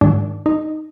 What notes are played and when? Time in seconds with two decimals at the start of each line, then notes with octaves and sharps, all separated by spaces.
0.01 G#2 D#3 D4
0.46 D#4